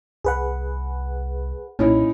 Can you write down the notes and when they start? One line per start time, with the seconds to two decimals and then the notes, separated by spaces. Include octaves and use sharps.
0.24 C2 G#4 B4 F#5
1.79 B1 A#2 C#4 D#4 E4